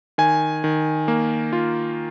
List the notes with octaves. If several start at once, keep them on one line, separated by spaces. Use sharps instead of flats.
D#3 G#5
D#3
A#3
F4